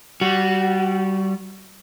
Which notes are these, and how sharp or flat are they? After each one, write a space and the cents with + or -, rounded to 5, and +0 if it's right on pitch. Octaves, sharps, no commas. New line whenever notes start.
G3 -25 F#4 +0